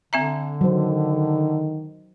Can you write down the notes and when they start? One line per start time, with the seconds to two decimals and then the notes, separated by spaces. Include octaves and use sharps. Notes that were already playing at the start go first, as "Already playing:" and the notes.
0.13 D3 C4 E5 A#5
0.61 D#3 F#3 C5